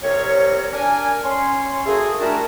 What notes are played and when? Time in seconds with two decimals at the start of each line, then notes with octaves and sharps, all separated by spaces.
0.03 C2 C3 A#4 C#5
0.73 D4 A#4 G#5
1.24 C#4 C6
1.86 A3 A#3 F#4 G#4
2.20 E3 G3 A3 D4 F#4 A#4